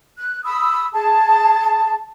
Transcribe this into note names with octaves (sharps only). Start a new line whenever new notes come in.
F#6
B5 D#6 E6
G#4 A5